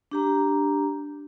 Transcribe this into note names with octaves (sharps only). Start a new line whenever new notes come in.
D4 G4 A#5